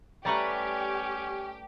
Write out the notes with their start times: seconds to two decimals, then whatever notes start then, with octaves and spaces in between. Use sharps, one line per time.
0.25 G3 A3 C#4 G4 B4 D5 A#5 C#6